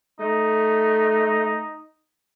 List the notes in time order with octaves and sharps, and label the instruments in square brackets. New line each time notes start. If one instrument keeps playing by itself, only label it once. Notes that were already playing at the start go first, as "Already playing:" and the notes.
[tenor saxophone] A3 [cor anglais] D#4